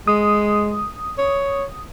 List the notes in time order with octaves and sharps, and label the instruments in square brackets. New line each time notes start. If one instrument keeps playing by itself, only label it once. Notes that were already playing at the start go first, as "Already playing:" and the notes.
[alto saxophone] G#3 [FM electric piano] D#6
[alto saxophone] C#5